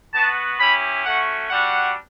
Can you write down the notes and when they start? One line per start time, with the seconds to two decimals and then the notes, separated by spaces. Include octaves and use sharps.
0.13 B3 F#4 A5
0.59 C#4 E4 G4 B5
1.05 A3 C#4 F#4 F#5
1.50 G3 D4 F#4 F#5